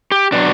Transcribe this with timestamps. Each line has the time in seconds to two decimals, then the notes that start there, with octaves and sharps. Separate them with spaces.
0.12 G4
0.32 B2 F#3 D4